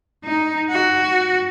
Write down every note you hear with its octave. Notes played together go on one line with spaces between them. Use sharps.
D#4
F#4